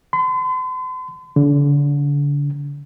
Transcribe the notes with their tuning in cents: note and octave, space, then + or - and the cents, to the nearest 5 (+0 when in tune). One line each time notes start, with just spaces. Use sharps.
C6 -45
D3 -35